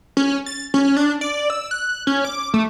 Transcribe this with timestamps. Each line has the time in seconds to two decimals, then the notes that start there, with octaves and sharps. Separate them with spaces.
0.17 C#4
0.46 A6
0.74 C#4
0.97 D4
1.21 D5
1.50 E6
1.71 F#6
2.07 C#4
2.25 D6
2.54 A3